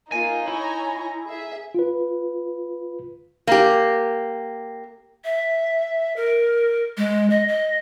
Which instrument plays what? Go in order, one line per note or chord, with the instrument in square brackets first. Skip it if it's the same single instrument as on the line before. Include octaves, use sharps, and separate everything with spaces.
[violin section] A#3 F4 [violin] D#4 [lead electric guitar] G#5
[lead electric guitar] E4 [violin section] C#5 G#5 A#5
[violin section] G#4 E5
[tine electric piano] F4 B4
[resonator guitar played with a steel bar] A#3 G4
[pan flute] E5
A#4
G#3
D#5
D#5